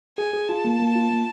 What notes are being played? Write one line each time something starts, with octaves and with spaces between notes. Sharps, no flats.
G#4 G#5
G#4
F4 A5
A#3
A#3
F4
A#3